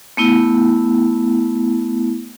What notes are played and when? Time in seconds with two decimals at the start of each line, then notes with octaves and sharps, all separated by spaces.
0.17 A3 B3 E4